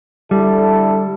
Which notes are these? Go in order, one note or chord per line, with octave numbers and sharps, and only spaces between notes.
D3 G3 E4 A4